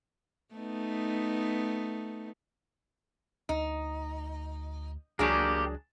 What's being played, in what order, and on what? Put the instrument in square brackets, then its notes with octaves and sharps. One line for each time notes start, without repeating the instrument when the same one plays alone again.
[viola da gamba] A3 B3 D#4
[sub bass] D2 [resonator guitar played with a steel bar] D#4
[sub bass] C#2 [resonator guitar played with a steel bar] F#3 D4 G#4 [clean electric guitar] A#3 G4